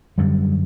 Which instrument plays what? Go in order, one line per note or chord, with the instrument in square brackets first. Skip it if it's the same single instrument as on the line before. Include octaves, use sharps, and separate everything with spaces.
[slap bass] F#2 D3 G3